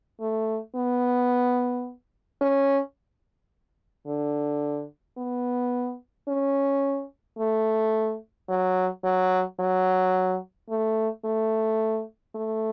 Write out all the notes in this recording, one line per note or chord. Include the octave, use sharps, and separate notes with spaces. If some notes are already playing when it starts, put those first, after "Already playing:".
A3
B3
C#4
D3
B3
C#4
A3
F#3
F#3
F#3
A3
A3
A3